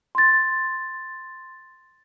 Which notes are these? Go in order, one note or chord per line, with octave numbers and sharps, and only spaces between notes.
C6 A6